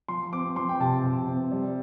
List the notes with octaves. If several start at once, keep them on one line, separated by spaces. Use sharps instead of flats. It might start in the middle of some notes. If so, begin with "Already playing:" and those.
F3 C6
C4 D6
F3 C6
G5
C3 A5
C3
C4
G3